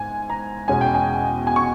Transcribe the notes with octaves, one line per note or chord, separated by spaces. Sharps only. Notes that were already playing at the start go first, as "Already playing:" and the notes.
Already playing: G#2 G#5
A#5
E2 B2 G#3 C#4 G#5
G5
G#5
G#5
C#6